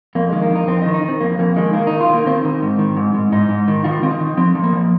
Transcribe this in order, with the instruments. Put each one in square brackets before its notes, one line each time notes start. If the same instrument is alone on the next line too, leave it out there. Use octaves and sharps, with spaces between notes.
[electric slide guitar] F2 A#3
D#3 G#3
A#3
F2
D#4
F2 C4
D#4
D#3
D#4
D#3
C4
F2 A#3
F2 A#3
D#3 G#3
D#3 A#3
D#3 D#4
F4
D#3 A#3
D#3 C4
D#3
G#2
D#3
G#2
G#2
G#2 D#4
G#2
D#3
D#3 F4
D#3 C4
D#4
D#3
F3 C4
F3
A#3
F3